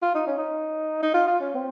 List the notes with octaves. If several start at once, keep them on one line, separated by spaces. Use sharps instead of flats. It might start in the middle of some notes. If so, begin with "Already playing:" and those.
F4
D#4
C#4
D#4
D#4
F4
F4
C#4
C4